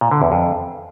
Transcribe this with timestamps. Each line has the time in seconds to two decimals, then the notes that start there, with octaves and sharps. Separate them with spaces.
0.01 A#2
0.11 D3
0.22 E2
0.32 F2